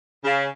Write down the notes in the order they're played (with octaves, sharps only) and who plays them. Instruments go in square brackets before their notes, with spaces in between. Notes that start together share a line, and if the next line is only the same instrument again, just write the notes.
[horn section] C#3